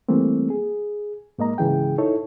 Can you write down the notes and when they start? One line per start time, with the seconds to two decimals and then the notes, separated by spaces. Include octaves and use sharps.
0.09 E3 G3 A3 A#3 C4
0.50 G#4
1.38 G#2 A#3 D#5 A#5
1.58 G#2 C#3 E3 G#4 G5
1.98 D#4 E4 A4 C#5